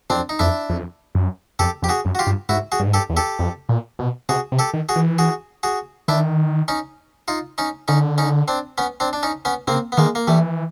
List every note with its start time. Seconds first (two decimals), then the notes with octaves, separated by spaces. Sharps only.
0.10 F2 C4 D4
0.29 D#4
0.39 F2 D4 E4
0.69 F2
1.15 F#2
1.59 F2 G4 A4
1.82 F2 G4
1.89 F#4 G#4
2.05 F#2
2.15 F#4
2.19 F4 G4
2.27 G2
2.49 G#2 E4 F#4
2.72 F#4 G#4
2.80 G2
2.87 G#2
2.94 G2 G4 A4
3.09 E2
3.17 G4 A4
3.39 F2
3.69 A#2
3.99 B2
4.29 C3 F#4 G#4
4.52 C3
4.59 G4 A4
4.73 D#3
4.89 F#4 G#4
4.96 E3
5.18 F#4 G#4
5.63 F#4 G#4
6.08 D#3 D4 E4
6.68 C#4 D#4
7.28 D#4 F4
7.58 C#4 D#4
7.88 D3 C#4 D#4
8.18 C#4 D#4
8.48 C4 D4
8.78 B3 C#4
9.00 C4 D4
9.13 D4
9.23 C#4 D#4
9.45 B3 C#4
9.67 C#3 A#3 C4
9.92 B3
9.97 D#3 G#3 A#3
10.15 A#3
10.27 E3 G3 A3